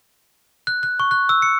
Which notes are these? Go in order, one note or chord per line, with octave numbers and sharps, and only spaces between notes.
F#6
F#6
C#6
F#6
E6
C#7